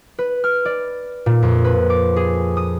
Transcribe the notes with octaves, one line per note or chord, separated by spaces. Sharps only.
B4
F6
D5
A#2
F2
B4
D6
G#4
D#6